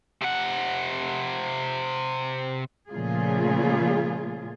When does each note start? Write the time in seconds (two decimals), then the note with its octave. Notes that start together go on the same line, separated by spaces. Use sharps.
0.22 C3 F#5
2.89 A#2 C#3 F3 A3 F4 G#4